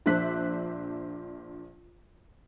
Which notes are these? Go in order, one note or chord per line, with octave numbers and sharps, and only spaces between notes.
A#1 D4 C5 E5 F#6 B6